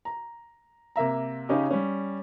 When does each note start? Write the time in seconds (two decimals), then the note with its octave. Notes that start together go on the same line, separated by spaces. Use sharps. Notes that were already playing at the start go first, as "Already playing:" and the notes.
0.05 A#5
0.96 C3 A#3 E5 A#5
1.49 C#3 C#4 D#4 G4
1.71 G3 C#4